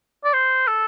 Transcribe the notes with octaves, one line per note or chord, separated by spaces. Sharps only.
D5
C5
A4